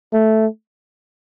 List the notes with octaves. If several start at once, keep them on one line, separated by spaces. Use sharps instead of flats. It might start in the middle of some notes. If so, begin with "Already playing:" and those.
A3